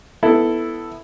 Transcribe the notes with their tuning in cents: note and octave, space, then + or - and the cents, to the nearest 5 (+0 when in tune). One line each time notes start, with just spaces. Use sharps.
B3 +0 E4 +0 A4 +5